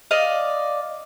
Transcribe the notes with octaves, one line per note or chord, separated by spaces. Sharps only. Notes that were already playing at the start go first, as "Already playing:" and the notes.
D5 D#5 F5